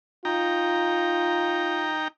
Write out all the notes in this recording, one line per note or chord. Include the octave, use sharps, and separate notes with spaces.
D#4 F4 G5 A#5